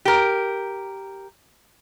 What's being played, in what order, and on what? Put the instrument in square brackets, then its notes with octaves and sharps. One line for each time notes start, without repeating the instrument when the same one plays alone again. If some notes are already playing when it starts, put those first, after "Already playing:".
[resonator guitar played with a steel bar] G4 A#4